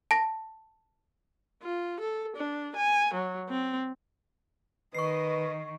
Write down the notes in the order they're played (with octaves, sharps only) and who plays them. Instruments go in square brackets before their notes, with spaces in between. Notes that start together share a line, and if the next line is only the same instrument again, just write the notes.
[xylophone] A5 A#6
[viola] F4
A4
D4
G#5
F#3
C4
[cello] D#3 [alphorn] B4 [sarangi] D#5 [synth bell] C#6 C7